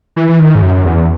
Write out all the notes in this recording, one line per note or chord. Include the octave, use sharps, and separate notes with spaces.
E3
E3
D#3
G#2
F#2
E2